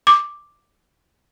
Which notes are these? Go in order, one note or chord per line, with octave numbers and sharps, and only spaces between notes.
D6